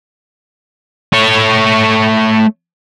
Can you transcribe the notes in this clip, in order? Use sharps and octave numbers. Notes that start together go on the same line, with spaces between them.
A3 C#5